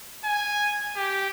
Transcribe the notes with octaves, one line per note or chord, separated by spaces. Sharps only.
G#5
G4